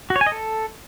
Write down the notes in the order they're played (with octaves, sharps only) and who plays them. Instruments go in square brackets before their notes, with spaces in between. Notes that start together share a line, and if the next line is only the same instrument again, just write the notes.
[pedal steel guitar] F#4
C#5
G#5
D#5
A4